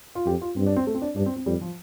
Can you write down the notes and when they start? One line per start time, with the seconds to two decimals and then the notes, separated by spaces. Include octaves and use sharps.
0.15 F4
0.26 F2 G4
0.42 F4
0.56 G2 C4
0.66 D4
0.76 C4
0.87 A3
0.94 C4
1.02 D4
1.16 G2 D4
1.26 C4
1.36 C4
1.46 F2 G3
1.61 F3